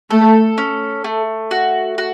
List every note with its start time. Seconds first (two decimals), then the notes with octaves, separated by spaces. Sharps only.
0.11 A3 A4
0.58 C#4
1.04 A3
1.51 F#4
1.98 F#4